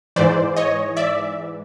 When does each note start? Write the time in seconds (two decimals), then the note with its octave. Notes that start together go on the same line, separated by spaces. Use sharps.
0.16 G#2 E3 C5 D5
0.57 C#5 D#5
0.97 D5 E5